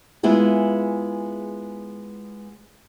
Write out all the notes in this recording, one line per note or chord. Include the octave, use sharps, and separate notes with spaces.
G#3 B3 E4 F4 G#4